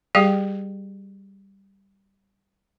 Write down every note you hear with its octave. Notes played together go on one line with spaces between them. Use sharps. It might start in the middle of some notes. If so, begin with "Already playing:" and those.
G3 G4 G#4 F5 G5